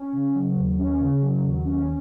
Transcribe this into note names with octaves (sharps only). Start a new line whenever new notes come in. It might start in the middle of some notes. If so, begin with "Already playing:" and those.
Already playing: C#4
C#3
F#3
D#2
C#4
C#3
F#3
D#2
C#4